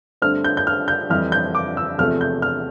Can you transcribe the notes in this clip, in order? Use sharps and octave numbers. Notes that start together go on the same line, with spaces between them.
G2 D3 A3 C4 F6
G6
G6
F6
G6
F2 E3 G3 F6
G6
D6
E6
E2 C3 F3 A3 F6
G6
F6